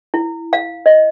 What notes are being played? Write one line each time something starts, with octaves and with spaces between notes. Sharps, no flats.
E4
F5
D#5